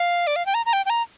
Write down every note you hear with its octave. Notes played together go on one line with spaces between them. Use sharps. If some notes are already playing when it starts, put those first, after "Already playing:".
Already playing: F5
D5
F5
G5
A#5
A#5
G5
G5
A#5